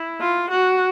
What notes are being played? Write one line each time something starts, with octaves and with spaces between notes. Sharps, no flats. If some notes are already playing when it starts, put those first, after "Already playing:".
Already playing: E4
F4
F#4